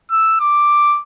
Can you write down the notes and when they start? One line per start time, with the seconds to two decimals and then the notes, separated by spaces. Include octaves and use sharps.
0.11 E6
0.40 D6